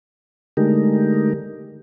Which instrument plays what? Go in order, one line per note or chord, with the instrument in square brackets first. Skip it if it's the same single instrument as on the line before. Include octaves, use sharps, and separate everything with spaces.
[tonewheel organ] D3 G#3 A3 D#4 G4 A#4